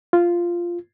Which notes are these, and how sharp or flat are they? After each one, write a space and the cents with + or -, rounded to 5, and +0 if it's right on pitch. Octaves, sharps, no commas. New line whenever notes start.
F4 -10